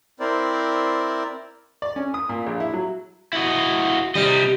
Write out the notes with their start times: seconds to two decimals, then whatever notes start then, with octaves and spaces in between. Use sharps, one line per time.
0.20 C4 E4 A#4 C5 D5
1.82 D5
1.96 C#4
2.14 D#6
2.29 A#2
2.47 A#1
2.60 E4
2.73 F#3
3.33 E4 F#4 D#5
4.15 C3 E3 G3 D#5